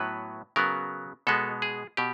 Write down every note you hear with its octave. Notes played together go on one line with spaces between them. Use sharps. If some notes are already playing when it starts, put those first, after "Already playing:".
Already playing: A2 F#3 B3 B4
C#3 F#3 B3 A#4
B2 G#3 B3 A4
G#4
B2 G4